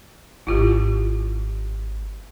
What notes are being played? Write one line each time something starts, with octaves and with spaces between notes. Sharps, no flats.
G#1 E4 F4 G4